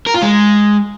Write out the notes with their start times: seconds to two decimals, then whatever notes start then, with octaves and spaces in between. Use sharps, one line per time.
0.06 A#4
0.14 F4
0.22 G#3